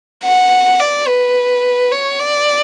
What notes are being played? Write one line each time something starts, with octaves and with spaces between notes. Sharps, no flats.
F#5
D5
B4
C#5
D5